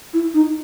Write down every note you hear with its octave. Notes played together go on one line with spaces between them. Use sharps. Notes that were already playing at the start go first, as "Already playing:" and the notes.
E4
D#4